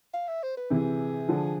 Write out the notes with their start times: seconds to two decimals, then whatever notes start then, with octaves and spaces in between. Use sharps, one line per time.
0.14 F5
0.28 E5
0.43 C5
0.57 B4
0.70 C3 E3 G#4
1.28 D3 F3